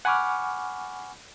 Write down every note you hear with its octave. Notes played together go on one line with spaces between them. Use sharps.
F#5 G#5 B5 C#6 D6 F6